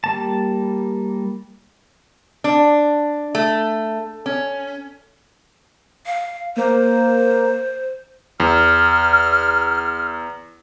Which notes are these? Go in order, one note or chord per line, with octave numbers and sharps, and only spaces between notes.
G3 A#3 A5
D4
A3
C#4
F5
A#3 C5
E2 F6